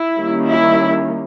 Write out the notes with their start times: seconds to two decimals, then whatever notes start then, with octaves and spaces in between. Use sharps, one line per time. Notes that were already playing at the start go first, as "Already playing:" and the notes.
Already playing: E4
0.17 D#3 G3 A#3 C#4
0.47 E4